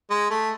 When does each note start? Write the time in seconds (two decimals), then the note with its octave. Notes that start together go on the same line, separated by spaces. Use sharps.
0.11 G#3
0.31 A3